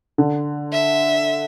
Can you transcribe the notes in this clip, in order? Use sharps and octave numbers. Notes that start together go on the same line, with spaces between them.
D3
E5